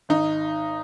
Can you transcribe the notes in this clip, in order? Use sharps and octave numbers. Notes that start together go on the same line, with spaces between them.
G#1 D#4